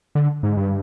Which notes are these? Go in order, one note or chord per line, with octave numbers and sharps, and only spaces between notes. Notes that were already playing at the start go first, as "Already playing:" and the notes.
D3
G#2
G2